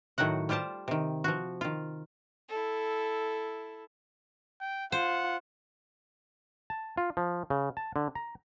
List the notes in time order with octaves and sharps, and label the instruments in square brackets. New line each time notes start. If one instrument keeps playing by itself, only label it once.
[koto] A2 D#3 F#3 F#4 F#5
G3 F4 G4 C5 A5
C3 D#3
F3 F#4
D#3 F4
[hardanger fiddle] E4 A4
[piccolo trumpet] G5
[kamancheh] F4 [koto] C5 [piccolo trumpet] F#5
[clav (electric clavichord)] A5
F4
F3
C#3
A5
D3
A#5